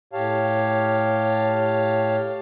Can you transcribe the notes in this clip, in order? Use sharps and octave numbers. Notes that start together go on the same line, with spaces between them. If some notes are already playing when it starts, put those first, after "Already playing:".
A2 G4 C#5 F5 A5